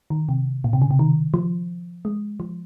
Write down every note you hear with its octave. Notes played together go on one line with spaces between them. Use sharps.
D#3
C3
A#2
C3
C#3
C3
D#3
F3
G#3
F3